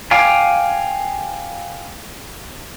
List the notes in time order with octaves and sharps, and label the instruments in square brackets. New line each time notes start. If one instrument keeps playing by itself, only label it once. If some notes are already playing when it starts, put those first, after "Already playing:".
[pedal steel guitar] F5 G5 G#5 D6